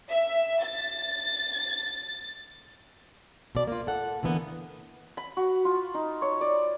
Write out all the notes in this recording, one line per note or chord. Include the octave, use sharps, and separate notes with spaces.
E5
A6
B2 D5
A#3 F4
A4 F#5
D3 E3 A#3 B3
B5
F#4
F4
D#4
C#5
D5